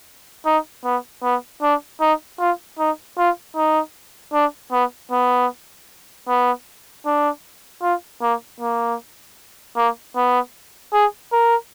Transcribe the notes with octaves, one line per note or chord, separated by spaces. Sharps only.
D#4
B3
B3
D4
D#4
F4
D#4
F4
D#4
D4
B3
B3
B3
D4
F4
A#3
A#3
A#3
B3
G#4
A#4